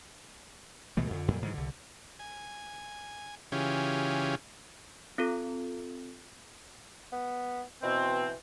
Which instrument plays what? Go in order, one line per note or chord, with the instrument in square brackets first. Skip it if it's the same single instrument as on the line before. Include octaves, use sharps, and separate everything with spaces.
[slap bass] C#2 B2 E3 A3
F2 D3
F2 A#2 G3
G#2 D3 E3 F#3
C2 D3
[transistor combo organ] G#5
C#3 E3 C#4 F4 G4 G#4
[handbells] C4 F4 A4
[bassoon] B3
[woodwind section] B2 C4 [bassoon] E3